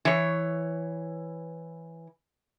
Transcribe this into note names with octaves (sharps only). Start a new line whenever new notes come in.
E3 C#5